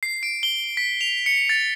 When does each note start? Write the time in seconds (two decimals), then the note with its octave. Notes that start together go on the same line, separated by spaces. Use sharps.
0.03 C7
0.23 D7
0.43 G7
0.77 B6
1.01 F7
1.26 C#7
1.49 A6